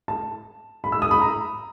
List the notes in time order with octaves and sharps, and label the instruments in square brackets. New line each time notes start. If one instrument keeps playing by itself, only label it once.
[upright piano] A5
B5
E6
D#6
B5
A#5